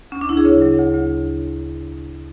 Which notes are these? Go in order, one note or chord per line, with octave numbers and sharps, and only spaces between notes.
D2 C#4
D4
D2 E4
G#4
C#3 C#5
F#3
D2
D2